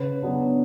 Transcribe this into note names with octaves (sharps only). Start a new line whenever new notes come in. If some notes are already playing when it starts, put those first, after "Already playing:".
Already playing: C#3 B4
F#3 B3 D4